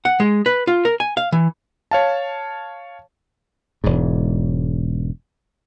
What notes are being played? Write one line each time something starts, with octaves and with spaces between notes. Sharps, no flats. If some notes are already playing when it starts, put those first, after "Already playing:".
F#5
G#3
B4
F4
A#4
G#5
F5
E3
C#5 F5 A5
E1 G#2